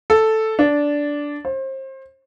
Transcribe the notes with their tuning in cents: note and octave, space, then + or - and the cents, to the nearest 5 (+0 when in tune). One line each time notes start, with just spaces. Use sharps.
A4 +0
D4 -10
C5 +30